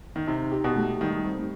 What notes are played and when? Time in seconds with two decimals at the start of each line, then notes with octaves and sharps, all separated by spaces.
0.16 D#3
0.27 C3 D#4
0.52 G4
0.64 B2
0.76 A3
1.01 D#3 G3
1.25 C4